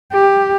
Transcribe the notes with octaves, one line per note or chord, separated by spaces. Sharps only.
G4